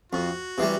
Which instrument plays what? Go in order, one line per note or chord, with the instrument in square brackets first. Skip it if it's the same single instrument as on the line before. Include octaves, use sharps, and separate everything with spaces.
[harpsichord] F2 [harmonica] F#4
[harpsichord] C3 E3 G3